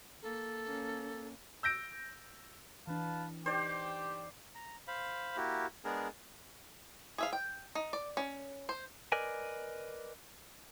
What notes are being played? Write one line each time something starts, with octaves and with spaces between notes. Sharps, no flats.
A#3 A4
A#3 C#4
E6 G6 A#6 D7
E3 D4 B4 F5 A5
D#4 G4 B4 C5 D5
A#5
C5 F5 B5
A#3 E4 F#4 G4
G#3 B3 D4 G#4 A#4
G#4 E5 F5
G5
D#4
D5
C#4
C5
A#4 B4 D5 D#5 G#5